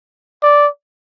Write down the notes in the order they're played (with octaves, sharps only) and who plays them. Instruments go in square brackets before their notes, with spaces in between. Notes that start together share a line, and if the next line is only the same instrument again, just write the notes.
[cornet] D5